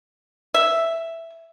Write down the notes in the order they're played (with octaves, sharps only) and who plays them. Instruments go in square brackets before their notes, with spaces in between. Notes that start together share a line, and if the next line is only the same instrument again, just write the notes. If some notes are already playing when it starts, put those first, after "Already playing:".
[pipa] E5